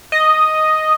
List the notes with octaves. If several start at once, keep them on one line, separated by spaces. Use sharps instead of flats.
D#5